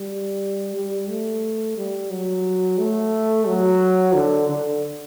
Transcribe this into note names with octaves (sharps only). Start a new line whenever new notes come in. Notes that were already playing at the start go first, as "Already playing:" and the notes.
Already playing: G3
G3
A3
G3
F#3
A3
F#3
D3
D3